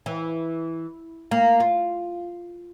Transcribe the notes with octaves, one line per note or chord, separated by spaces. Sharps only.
E3
A#3
F4